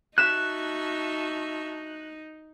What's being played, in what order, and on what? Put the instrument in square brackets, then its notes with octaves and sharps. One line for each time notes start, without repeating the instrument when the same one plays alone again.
[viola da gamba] D#4 [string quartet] F#4 E5 A5 [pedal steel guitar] F#6 [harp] B6 E7